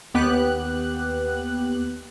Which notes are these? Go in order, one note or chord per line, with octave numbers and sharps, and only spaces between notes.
D#2 B3 G4 F#6